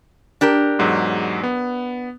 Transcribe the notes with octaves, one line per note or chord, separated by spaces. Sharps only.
D4 G4 A#4
E2 G#2 F#3
B3